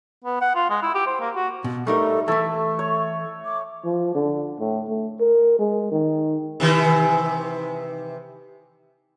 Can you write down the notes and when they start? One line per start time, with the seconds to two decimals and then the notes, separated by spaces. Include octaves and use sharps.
0.24 B3
0.41 F#5
0.55 F4
0.70 G#3
0.82 E4
0.95 G4
1.07 C5
1.20 A#3
1.36 F#4
1.64 B2
1.87 G3 A3 D#4 A4 A#4
2.28 E3 A3 A4 E5 C#6
2.79 C#5
3.45 D6
3.85 F3
4.15 D3
4.60 A2
4.89 A3
5.20 A#4
5.59 G#3
5.91 D#3
6.60 C3 D#3 E3